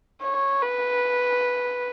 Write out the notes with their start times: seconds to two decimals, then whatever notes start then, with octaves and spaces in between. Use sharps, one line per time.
0.22 C#5
0.62 B4